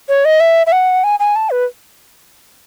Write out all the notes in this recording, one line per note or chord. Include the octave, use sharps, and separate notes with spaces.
C#5
D#5
E5
E5
F#5
G#5
G#5
A5
B4